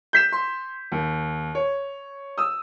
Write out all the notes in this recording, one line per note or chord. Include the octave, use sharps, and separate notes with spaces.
G6 B6 E7
C6
D#2
C#5
D#6 E6